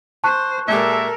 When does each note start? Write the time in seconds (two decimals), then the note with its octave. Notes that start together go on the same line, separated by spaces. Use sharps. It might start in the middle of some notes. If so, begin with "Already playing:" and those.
0.24 C5 A5 C#6 F#6
0.68 A#2 G#3 G4 A4 A#4 E5